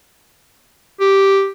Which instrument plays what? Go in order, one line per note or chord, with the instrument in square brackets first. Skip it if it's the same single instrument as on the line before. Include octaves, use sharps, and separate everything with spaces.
[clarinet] G4